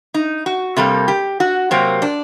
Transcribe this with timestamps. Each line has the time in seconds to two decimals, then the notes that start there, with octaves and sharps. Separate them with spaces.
0.14 D#4
0.46 F#4
0.77 C3 G3 A#3 A4
1.08 G4
1.40 F#4
1.71 C3 F#3 A#3 C4
2.02 D4